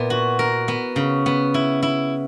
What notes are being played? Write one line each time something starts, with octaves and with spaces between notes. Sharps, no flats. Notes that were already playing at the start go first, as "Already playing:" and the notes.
Already playing: A#2 B3 E4
F#4
A#4
B3
C#3
B3
E4
E4